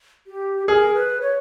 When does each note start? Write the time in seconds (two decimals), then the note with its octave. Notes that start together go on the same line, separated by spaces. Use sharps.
0.27 G4
0.68 G#4 A#4
0.94 B4
1.21 C#5